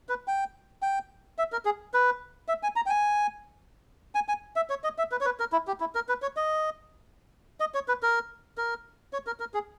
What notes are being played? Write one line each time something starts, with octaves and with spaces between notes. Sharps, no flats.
B4
G5
G5
E5
A#4
G#4
B4
E5
G#5
A#5
G5
G#5
G#5
G#5
E5
C#5
D#5
E5
B4
C#5
B4
A#4
E4
G4
E4
A#4
B4
C#5
D#5
D#5
C#5
B4
A#4
A#4
C#5
A#4
A#4
G#4